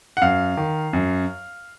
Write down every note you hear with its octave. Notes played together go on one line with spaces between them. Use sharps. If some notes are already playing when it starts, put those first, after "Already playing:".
F#5
F#2 F5
D#3
F#2